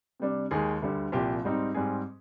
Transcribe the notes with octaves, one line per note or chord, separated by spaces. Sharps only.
C3 G3 D4
D#2 D#3 G#3 G#4
D2 D3 G3
C2 A#2 F3 G4
G#2 G3 C4 D#4
G#2 G3 C4 G#4